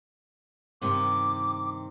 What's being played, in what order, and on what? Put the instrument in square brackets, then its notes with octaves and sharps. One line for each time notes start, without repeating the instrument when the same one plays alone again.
[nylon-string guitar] G2 C3 D#3 [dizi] D6